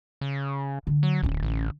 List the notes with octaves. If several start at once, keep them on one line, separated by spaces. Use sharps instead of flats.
C#3
D3
F#3
D1 D2 C#4
A1